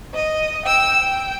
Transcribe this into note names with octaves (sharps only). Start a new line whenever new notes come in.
D#5
G5 E6
G5